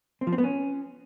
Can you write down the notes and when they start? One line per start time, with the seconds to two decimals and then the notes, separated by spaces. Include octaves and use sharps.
0.21 C4
0.27 F3
0.33 C4
0.38 B3
0.44 C#4